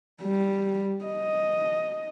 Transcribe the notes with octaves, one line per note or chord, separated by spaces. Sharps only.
G3
D#5